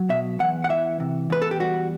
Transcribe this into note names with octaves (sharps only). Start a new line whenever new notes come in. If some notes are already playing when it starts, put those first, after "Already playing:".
Already playing: F#3
B2 E5
E2 F#5
F#5
E3 E5
C3
E2 B4
A4
G4
G3 F#4